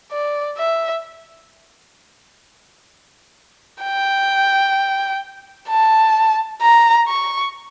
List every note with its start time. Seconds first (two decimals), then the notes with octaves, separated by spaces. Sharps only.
0.12 D5
0.58 E5
3.83 G5
5.69 A5
6.62 A#5
7.09 C#6